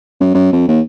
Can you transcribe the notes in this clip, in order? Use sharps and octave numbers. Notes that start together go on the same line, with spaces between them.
F#2
F#2
F2
D#2